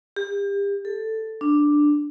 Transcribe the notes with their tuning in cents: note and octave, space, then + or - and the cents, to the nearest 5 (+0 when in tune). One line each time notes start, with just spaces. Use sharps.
G4 +35
A4 +5
D4 +5